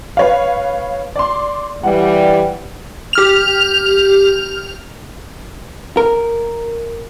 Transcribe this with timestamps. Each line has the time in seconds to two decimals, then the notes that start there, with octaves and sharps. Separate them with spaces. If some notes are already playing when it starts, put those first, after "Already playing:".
0.17 B4 C#5 F5
1.16 D5 C6
1.83 E3 G3 F#5
3.13 G4 F6 F7
5.97 A#4